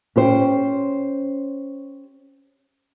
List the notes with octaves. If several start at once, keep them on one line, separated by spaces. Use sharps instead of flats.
C#4 G4 C5